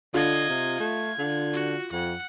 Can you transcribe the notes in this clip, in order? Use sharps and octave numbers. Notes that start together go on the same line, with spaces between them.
D3 F4 D#5 G#6
C3
A3 G#6
D3
F#4
F2 F#5